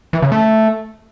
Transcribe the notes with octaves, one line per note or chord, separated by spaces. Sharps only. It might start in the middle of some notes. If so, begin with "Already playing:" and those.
E3
C#3
A3